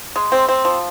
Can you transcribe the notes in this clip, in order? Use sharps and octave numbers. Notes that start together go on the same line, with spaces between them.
G#3
C4
C4
F3